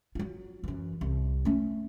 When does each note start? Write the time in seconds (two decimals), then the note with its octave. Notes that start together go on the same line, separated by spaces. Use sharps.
0.15 F#3 F4
0.64 F#2 E3
1.01 C2
1.45 A3 C#4